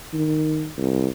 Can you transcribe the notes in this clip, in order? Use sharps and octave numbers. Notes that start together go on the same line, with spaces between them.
D#3
C2